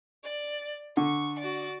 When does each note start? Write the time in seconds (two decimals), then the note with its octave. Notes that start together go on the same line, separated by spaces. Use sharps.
0.24 D5
0.97 D3 C#6
1.39 F#4 D5